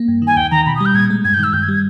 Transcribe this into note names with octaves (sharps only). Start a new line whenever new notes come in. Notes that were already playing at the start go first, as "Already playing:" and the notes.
Already playing: A#3
G2
D#3
G#5
D#2 G5
D#3 A#5
B2 B5
D#6
G3
G6
A#2 G#6
G#3
G2 G#6
G6
D#3 E6
G2 G6
G#6
G3
G#6